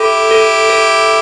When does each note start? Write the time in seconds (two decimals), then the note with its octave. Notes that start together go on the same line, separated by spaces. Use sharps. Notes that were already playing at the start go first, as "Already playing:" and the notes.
Already playing: E4 G4 A4
0.31 A4
0.70 A4